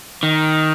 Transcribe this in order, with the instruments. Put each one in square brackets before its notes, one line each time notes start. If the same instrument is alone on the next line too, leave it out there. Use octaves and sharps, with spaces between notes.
[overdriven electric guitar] D#3